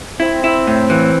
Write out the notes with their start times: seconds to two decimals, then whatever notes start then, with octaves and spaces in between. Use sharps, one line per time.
0.20 C4 E4
0.44 E4
0.67 A2
0.90 E3